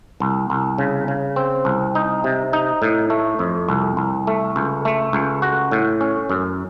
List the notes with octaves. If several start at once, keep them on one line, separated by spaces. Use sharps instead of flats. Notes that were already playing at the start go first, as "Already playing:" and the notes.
C2
C2
C#3
C#3
C4
C2
D#4
C3
D#4
A2
A3
F2
C2
C2
A3
C#2
A3
C#2
F#4
A2
C#4
F#2